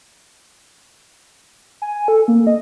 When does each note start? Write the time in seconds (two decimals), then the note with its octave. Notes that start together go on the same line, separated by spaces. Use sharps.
1.82 G#5
2.08 A4
2.28 A#3
2.47 D#5